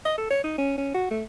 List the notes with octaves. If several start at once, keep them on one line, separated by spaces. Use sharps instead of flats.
D#5
A4
C#5
D#4
C#4
C#4
F#4
A3